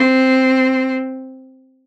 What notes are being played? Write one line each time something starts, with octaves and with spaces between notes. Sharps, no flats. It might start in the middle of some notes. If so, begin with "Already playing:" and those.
Already playing: C4